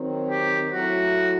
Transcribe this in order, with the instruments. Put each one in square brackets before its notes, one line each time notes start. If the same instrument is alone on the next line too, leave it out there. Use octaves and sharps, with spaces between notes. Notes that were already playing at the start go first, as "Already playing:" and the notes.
Already playing: [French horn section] D#3 F#3 C4
[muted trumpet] G4
[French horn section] F#3 A3 E4 [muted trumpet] F#4